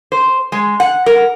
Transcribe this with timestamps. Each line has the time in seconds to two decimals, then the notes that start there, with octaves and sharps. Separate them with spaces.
0.12 C5
0.52 G#3
0.80 F#5
1.06 A#4